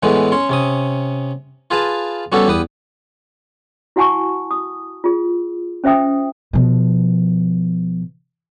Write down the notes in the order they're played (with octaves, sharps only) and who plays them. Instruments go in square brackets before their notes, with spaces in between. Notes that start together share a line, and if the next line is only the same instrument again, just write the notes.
[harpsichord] A2 E3 G#3 A3 B3
C#4 C#5 C6
C3 C#4 D#6
F4 G#4 B4 F5 A5
G3 B3 C#4 F#4 G4 A4
E2 G4 B4 D#6
[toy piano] E4 F#4 F#5 G#5 A5 C#6
D#6
F4 G#4
C#4 C5 E5 G5 D#6
[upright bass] B2 F3